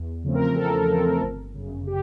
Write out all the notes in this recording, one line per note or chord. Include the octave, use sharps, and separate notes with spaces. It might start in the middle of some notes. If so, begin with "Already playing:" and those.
Already playing: E2
C#3 F3 A3 C4
A#4
E2 A4
C#3 F3 A3 C4
G1
F#2 C#3
G4